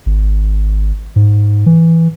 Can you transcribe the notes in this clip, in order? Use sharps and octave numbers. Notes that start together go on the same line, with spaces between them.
G#1
G#2
E3